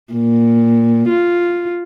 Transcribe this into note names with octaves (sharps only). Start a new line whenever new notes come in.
A#2
F4